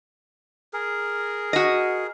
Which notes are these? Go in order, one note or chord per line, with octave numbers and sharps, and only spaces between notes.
G#4 A#4
F#4 D#5